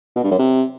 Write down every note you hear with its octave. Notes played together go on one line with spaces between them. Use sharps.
B2
G2
F#2
C3